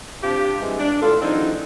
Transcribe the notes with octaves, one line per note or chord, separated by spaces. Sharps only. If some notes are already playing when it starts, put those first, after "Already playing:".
C3 D4 F4 G4
G2 C3 E3 G#3
D4
A2 D#3 B3 F4 A4
E3 F#3 G#3 C4 D4 D#4